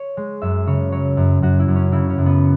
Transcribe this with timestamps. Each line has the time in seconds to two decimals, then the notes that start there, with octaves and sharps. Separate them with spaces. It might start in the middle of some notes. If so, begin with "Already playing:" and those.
Already playing: C#5
0.17 G#3
0.42 F#2 E5
0.67 C#3 C#5
0.92 F#3 C#5
1.17 F#2
1.42 F#2 F#4
1.60 E4
1.68 F#2
1.76 C#4
1.92 C#3 E4
2.10 C#4
2.18 F#2
2.26 B3